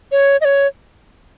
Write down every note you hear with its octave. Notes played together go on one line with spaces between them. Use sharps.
C#5
D#5
C#5